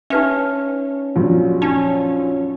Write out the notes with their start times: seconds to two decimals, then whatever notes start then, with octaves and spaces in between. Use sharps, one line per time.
0.10 C#4 D#4 B4 E5
1.16 A#1 F#2
1.62 C#4 D#4